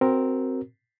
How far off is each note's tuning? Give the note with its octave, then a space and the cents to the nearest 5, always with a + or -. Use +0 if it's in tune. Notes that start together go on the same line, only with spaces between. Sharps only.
C4 +0 F#4 +15 A#4 +0